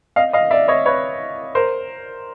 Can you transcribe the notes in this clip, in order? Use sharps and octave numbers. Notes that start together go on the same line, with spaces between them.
D#5 F5
D#5 F5
D5 E5
C#5 D#5
B4 C#5
A#4 C5